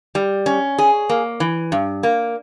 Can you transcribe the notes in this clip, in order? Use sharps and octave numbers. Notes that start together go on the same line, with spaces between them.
G3
C#4
G#4
A#3
E3
G2
A#3